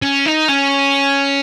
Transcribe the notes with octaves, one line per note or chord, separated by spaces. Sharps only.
C#4
D#4
C#4